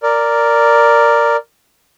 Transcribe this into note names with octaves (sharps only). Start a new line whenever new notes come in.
A#4 D5